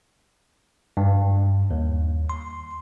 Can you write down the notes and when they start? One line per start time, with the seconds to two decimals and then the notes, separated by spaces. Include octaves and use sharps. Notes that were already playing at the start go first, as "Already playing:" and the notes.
0.97 G2
1.71 D#2
2.30 C6